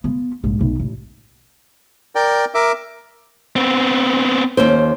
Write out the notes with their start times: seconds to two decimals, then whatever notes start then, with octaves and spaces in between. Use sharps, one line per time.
0.04 B3 F4
0.44 A#1 G#2
0.61 B1
0.80 A1
2.15 A#4 D5 G5
2.54 A#4 E5 D6
3.56 B3 C4
4.57 D#2 C#4 C5